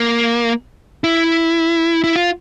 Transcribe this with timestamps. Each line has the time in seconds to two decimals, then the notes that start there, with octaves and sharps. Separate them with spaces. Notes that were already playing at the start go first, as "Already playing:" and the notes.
Already playing: A#3
1.04 E4
2.04 E4
2.16 F4